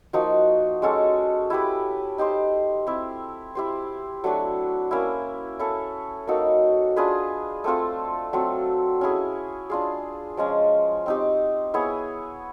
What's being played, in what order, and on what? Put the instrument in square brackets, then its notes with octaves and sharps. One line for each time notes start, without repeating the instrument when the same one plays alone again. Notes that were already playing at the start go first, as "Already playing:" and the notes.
[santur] F3 A#3 D#4 F#4
G#3 C#4 F#4 A4
E4 G4 B4
D#4 G4 C5
C4 E4 G4
E4 G4 C5
F#3 A3 D4 F#4
A#3 C#4 E4
C#4 E4 A4
A#3 D#4 F#4 A4
D4 F4 G#4 B4
A3 C4 F4 A4
F#3 A3 C4 F4
C#4 E4 G#4
D4 F4 G#4
F3 G#3 C#4
C4 D#4 G4
B3 E4 G#4 C#5